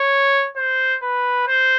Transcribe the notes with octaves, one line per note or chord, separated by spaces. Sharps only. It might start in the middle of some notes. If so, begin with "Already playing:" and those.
Already playing: C#5
C5
B4
C5